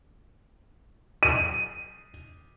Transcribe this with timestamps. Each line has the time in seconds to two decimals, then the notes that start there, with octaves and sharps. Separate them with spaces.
1.23 D#7